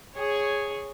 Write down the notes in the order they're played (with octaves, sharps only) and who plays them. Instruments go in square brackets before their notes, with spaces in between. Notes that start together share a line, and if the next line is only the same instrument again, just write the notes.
[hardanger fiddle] G#4 C#5